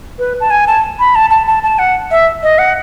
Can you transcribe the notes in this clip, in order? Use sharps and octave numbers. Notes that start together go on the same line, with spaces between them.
B4
A5
G#5
A5
B5
A5
A5
A5
A5
F#5
E5
D#5
F#5